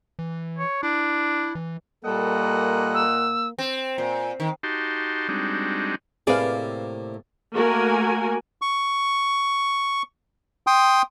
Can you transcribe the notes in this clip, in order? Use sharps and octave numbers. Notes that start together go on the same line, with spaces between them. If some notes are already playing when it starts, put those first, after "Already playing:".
E3
C#5
D4 E4
E3
A#2 G3 A#3 A4 D#5 F#5
E6
C4
A#2
D#3
D#4 F#4 G4 A5 C6
G3 G#3 C4 D4 D#4 F#4
A2 C3 A#3 G#4 B4 D5 F5
A3 A#3 F#4 A#4 G#5
C#6
G5 C6 D#6